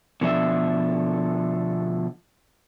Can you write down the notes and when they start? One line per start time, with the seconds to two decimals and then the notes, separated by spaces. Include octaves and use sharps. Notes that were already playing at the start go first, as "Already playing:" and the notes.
0.21 B2 D3 F3 A3 D4 E5